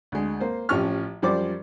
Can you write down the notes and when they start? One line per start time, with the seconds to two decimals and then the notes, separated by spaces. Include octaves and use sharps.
0.12 D2 G#3
0.40 A#3 C5
0.69 A1 F3 C#4 G4 C#6 F6
1.22 F#2 F3 G3 C5 D5 D6